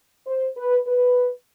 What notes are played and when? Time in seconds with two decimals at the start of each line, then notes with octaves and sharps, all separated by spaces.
0.26 C5
0.57 B4
0.87 B4